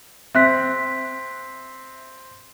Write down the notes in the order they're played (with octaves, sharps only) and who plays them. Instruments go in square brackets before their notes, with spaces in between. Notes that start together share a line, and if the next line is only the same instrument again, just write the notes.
[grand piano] C4 [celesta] E5 F#6 B6